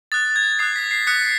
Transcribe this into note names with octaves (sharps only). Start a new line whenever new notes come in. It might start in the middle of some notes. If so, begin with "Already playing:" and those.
D#6 F#6 A6
G#6
D#6 F#6 C7
B6
C7
D#6 F#6 B6 C#7